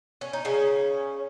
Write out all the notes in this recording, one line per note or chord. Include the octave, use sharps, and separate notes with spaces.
C#4
D#4
C#3 C#4